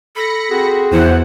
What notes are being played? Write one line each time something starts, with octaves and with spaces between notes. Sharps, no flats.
A4 B5 A#6 C#7
C4 F#4 G#4
E2 E3 C5 F#5